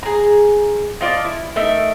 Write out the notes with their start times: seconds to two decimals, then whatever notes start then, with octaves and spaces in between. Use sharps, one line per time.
0.03 G#4 A#5
1.01 D#4 F4 D5 A5
1.25 E4
1.56 A3 D#4 A#4 E5